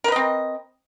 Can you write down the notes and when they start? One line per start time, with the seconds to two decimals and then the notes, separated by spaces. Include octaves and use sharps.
0.04 A#4
0.08 B4
0.12 D#5
0.16 C4